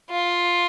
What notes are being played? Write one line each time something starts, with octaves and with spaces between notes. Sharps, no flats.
F4